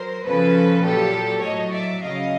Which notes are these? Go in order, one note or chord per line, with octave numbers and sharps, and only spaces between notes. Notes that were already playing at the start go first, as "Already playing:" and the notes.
Already playing: F#3 A#4 C5
C#3 F3 A4 B4
A#2 F#3 G4 A4
A2 F#3 C#5 D#5
D5 E5
C#3 F#3 D#5 F5